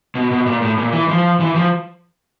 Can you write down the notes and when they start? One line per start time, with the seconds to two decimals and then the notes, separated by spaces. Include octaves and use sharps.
0.15 B2
0.31 B2
0.46 A#2
0.62 A2
0.78 A#2
0.92 E3
1.08 F3
1.40 E3
1.55 F3